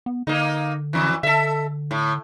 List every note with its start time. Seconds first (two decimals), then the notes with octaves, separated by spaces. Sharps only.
0.06 B3
0.27 D3 A#3 D#4
0.93 F2 E3
1.23 D3 A4 E5
1.91 A2